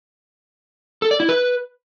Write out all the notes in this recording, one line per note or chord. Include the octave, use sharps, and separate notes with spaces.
A4
D5
E4
B4